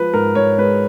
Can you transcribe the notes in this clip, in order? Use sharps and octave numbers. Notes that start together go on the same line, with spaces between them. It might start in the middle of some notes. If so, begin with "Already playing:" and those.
Already playing: F3 G#3 B4
G#2 A#4
G#2 C#5
G#3 B4